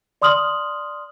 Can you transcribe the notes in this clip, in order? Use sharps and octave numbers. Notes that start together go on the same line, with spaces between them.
D5 C6 D#6 F6 F#7